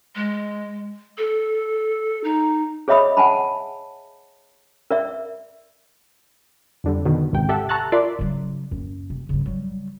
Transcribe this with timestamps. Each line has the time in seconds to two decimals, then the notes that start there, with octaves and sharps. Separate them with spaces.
0.16 G#3
1.18 A4
2.24 D#4
2.88 G#4 C#5 D#5 E5 B5 D#6
3.17 F#5 G#5 A5 B5
4.91 A#4 D5 E5
6.84 F2 D3 G3
7.05 B2 D3 D#3
7.33 G#1 C#2 C3 G5
7.49 G4 A4 E5 F#5
7.69 A5 A#5 C#6 E6 F#6 A6
7.92 F4 A#4 D5 E5 C6 D6
8.19 C#3 F#3
8.71 F#2 A#3
9.10 C3
9.29 G2 C#3
9.46 F#3 G3